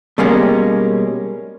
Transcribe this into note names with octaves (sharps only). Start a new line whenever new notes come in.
B2 G3 G#3 A#3 C#4